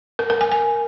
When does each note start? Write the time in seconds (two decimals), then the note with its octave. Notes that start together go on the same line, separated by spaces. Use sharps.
0.19 A#4
0.30 A#4
0.41 G#5
0.52 G#5